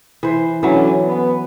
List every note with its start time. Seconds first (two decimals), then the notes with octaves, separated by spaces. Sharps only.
0.23 E3 C5
0.63 D3 E3 F#3 C#4
1.05 B3